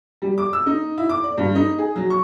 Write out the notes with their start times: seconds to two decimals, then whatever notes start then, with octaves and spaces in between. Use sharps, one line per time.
0.22 G3
0.38 D6
0.53 E6
0.66 D#4
0.98 E4
1.09 D6
1.24 D5
1.38 G2
1.55 D#4
1.78 G#4
1.96 F#3
2.10 C#6